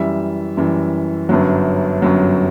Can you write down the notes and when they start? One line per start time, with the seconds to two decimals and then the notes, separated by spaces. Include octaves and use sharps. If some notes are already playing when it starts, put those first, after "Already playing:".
Already playing: F#2 E3 G3 E5
0.57 F#2 E3 G3
1.29 G1 F#2 F#3
2.02 G1 F#2 F#3